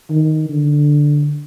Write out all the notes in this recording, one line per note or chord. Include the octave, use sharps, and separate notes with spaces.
D#3
D3